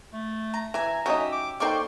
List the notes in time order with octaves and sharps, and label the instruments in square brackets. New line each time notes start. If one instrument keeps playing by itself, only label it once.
[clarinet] A3
[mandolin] A#5
[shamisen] E3 [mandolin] E5 G#5 [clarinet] A#5
[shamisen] F#3 C#4 D#4 [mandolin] G4 E5 D#6
[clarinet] D6
[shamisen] A#3 D#4 G5 [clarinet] A4 [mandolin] C5 D5 C#6